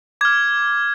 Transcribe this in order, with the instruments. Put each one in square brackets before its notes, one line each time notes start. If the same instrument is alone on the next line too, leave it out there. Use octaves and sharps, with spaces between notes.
[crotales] D6 F6 G#6